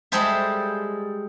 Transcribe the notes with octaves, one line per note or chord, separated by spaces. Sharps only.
G3 G#3 G#4 A4 C5 E5